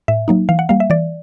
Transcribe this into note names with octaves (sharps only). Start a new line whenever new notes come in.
A2 E5
F#3 A#3 D#4
E3 F5
F#5
G3 A#3 F5
E5
E3 D5